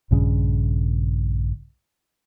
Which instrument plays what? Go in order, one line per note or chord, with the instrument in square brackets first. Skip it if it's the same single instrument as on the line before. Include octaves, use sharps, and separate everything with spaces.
[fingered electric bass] A#1 G2 C#3